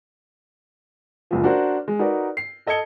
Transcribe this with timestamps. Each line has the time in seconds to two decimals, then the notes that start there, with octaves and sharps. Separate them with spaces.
1.31 F#1 C#2 F3
1.44 D4 F#4 A#4 C5
1.88 G#3
1.99 D#4 F#4 A#4 B4 D5
2.37 C7
2.67 A4 D#5 A5 G#6 C#7 G7